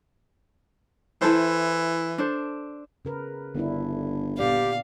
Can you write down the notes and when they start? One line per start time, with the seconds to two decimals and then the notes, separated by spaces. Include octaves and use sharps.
1.21 E3 E4 A4 C5
2.18 D4 A4 C5
3.05 C#3 A#4 B4
3.55 G1 D3 D4 E4
4.39 A#2 B3 G4 D5 F5